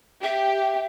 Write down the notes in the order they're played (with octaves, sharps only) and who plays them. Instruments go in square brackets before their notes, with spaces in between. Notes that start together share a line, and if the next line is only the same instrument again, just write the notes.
[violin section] G4 [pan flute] E5